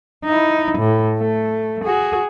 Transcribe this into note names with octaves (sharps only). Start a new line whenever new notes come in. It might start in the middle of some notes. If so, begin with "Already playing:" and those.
D#4 E4
A2
A3
F#4 G#4